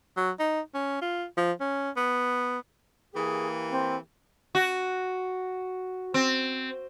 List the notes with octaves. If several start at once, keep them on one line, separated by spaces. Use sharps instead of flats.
F#3
D#4
C#4
F4
F3
C#4
B3
E3 A#3 G4 G#4
C4
F#4
C4